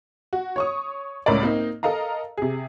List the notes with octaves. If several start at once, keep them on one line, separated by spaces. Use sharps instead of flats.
F#4
C#5 C#6 D#6
C#2 A2 A#4 C#5 D5
A#3 C4 D#4
A4 A#4 D#5 F5 A#5
C3 G#4